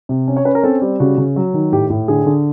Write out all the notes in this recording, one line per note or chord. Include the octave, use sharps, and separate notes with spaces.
C3
C#4
C#5
C#4 B4
A#4
C4 A4
G3
C#3 F#4
C#3
F#3
D#3
A2 G4
A2
D3 G#4
D3